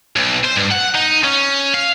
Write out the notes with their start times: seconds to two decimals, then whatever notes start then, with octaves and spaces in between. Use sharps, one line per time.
0.16 B1
0.44 C5
0.56 G2
0.71 F#5
0.95 D#4
1.24 C#4
1.74 F5